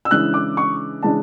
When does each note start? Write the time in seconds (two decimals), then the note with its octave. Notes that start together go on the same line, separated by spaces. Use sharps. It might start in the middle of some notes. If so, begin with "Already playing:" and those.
0.05 E6
0.11 C#3 E3 G#3 D4 F#6
0.34 D6
0.57 C#6
1.03 C#3 E3 G#3 D4 A5